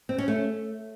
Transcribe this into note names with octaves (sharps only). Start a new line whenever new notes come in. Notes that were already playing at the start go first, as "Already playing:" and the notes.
C4
C#4
A3